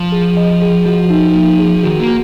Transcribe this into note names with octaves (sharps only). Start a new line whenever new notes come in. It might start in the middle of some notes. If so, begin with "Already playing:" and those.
Already playing: F3
G#4
D#5
G#4
F3 F#4
D#4
A#3
G#4
D#3 F#4
A#3
F#4